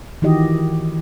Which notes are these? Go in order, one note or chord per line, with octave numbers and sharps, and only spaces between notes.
D#3 E3 D#4 F#4 G4 D#5